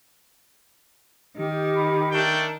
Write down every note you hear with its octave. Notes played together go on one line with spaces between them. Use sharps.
D#3 G4
B5
A3 D4 A#4 G5